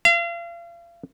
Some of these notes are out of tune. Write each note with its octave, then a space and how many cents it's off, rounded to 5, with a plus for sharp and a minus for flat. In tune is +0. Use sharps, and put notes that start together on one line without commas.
F5 -35